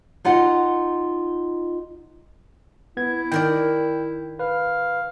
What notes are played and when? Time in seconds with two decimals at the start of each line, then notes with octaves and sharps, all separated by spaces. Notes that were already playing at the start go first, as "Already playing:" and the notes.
0.25 D#4 F4 D#5 F#5
2.97 B3 E4 G#6
3.32 D#3 A#4 D5 G5
4.39 B4 F5